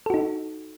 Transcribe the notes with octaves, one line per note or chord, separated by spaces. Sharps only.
D#4 F#4 A4